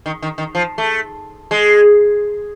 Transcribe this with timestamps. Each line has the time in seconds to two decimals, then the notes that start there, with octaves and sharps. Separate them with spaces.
0.06 D#3
0.22 D#3
0.38 D#3
0.55 F3
0.78 A3
1.51 G#3